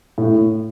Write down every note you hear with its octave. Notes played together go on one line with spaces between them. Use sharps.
A2